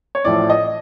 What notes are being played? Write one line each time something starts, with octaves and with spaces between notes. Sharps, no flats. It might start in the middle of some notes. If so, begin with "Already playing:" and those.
C#5
A1 A2 F3 A3 D5
D#5